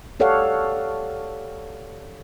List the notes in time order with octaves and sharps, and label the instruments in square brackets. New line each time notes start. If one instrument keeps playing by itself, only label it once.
[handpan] G4 A4 C#5 D5 F5 F#5